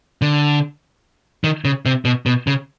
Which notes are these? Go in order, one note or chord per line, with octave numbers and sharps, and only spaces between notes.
D3
D#3
C#3
C3
B2
B2
C#3